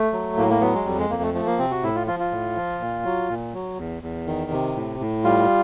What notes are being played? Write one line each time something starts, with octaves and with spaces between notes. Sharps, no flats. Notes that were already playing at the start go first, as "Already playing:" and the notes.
Already playing: A3
F#3
A2 A#3
A#3
F#3 B3
G#3
F2 G3
G#3
F2 A#3
A3
F3 A3
A#3
C3 C4
F#4
A2 E4
F4
F3 F4
F4
A2
F3
A#2
F#3
A#2
F#3
E2
E2
D#3
C3
A2
A2
G3 F4